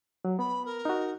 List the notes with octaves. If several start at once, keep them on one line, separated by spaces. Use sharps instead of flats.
F#3
B3 B5
A#4
D#4 F#4